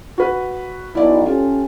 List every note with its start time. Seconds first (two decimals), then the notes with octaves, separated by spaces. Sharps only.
0.18 F#4 B4
0.95 B1 E4 D5
1.26 C#4 F4 G4 A4